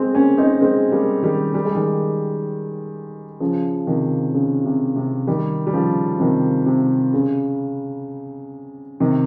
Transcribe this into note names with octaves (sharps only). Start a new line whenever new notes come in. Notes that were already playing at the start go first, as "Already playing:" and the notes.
Already playing: G#3 C4
A#3 C#4
C4 D#4
G#3 C4
G3 A#3
D#3 G3
G3
G#3
D#3 G3
C#3 F3
C3 D#3
C#3
C3
C3
D#3 G3
G3
C#3 F3
C3 D#3
C3
C#3
C3 D#3